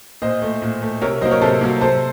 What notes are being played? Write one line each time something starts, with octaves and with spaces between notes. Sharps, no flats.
A#2 C5 D#5
A3
A#2
A3
C3 A#4 C#5
F#3 A#3 C5 D#5
A#4 C#5
C3 A4 C5
F#3 A#3
C3 A4 C5